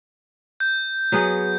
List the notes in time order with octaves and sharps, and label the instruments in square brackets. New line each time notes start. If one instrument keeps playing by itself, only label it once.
[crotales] G6
[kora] F#3 B3 G#4